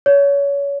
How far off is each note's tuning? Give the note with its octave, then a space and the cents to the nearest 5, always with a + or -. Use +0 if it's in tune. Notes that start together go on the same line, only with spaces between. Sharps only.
C#5 +25